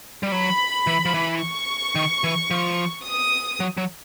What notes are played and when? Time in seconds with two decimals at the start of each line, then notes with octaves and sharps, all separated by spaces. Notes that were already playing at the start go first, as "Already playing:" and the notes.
0.23 G3
0.32 F#3 B5
0.87 E3
1.05 F3
1.14 E3
1.42 C#6
1.95 D#3
2.24 E3
2.51 F3
3.05 D#6
3.60 F#3
3.77 F#3